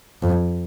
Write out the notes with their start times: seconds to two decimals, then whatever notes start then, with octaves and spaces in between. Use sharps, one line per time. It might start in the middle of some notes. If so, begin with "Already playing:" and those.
0.22 F2